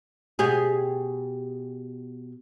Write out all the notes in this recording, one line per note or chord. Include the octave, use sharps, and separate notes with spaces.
B2 G4 G#4